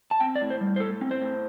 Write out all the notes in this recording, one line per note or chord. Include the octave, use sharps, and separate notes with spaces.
A5
C4 G5
D5
A2
C5
G3
C5
A2 A4
C4
C5
A2